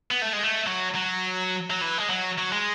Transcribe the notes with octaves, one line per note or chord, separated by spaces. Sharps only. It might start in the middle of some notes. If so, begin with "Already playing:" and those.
B3
A3
G#3
A3
F#3
F#3
F#3
E3
G#3
F#3
F#3
G#3